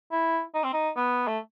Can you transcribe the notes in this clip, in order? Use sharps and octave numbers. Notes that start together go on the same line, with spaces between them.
E4
D#4
C4
D#4
B3
A3